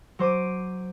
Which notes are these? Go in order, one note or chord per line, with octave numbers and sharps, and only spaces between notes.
F#3 C5 D6 D#7